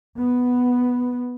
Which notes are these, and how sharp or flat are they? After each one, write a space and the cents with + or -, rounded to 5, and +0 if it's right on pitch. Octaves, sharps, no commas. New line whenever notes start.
B3 +0